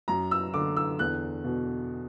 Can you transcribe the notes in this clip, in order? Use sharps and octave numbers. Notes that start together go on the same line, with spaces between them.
F#2 A#5
E6
D3 D6
E6
E2 F#6
B2